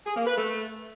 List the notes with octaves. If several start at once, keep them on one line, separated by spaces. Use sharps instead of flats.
G#4
A#3
B4
A3